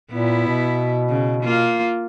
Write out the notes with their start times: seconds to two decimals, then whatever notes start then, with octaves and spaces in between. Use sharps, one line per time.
0.12 A#2 B3 E4
0.48 B2
1.09 C#3
1.44 A#3 F4